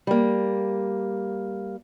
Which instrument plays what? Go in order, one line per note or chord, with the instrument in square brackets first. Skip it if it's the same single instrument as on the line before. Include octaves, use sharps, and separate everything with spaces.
[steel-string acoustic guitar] G3 A#3